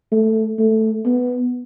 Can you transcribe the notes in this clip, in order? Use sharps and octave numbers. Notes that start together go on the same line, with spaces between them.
A3
A3
B3